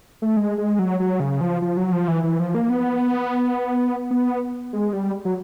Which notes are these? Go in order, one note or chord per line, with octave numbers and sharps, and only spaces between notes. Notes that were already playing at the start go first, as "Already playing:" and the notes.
A3
G#3
G#3
F#3
F#3
C#3
F3
F3
F#3
F3
E3
E3
F3
A#3
B3
B3
G#3
G3
F#3